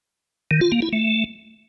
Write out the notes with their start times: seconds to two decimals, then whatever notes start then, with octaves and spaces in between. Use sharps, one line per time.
0.51 D#3
0.61 F4
0.72 A#3
0.82 E4
0.93 A3